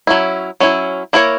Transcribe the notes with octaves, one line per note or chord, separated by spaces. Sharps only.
F#3 C#4 E4
F#3 C#4 E4
A#3 E4 A#4 C#5